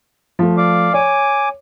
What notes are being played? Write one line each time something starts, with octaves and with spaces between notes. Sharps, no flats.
F3 A3
D5 F5 D6
C#5 G#5 D6